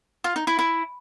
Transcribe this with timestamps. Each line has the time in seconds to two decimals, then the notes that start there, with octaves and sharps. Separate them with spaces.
0.24 F4
0.36 D#4
0.47 E4
0.59 E4